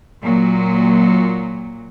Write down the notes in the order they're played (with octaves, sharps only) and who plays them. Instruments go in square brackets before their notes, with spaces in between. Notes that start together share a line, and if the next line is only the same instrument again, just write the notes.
[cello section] A#2 F#3